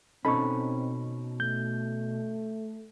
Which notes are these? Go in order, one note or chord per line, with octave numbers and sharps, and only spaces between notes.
B2 C4 C#4 D#4 A4 B5 C#6
A3 G6